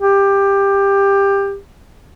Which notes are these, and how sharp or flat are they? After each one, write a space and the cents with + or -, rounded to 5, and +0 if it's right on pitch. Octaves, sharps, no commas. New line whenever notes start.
G4 +15